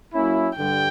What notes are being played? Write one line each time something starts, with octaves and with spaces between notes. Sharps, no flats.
F#3 A#3 C#4 E4
G2 D3 G3 G5